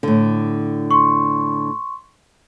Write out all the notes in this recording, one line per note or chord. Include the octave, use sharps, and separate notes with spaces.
A2 D3
C6 C#6